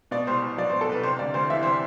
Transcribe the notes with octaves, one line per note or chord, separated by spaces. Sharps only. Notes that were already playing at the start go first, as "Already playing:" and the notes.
B2 D5
C2 C5
C2
F#3 D5
C5
B2
A4
C2 B4
C3 C5
D2 D5
D2 C5
E3 E5
C3 C5